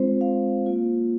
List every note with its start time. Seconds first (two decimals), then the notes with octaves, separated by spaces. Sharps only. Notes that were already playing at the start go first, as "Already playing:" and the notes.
Already playing: G#3 C4 F4 C5
0.21 F5
0.66 A#3 F4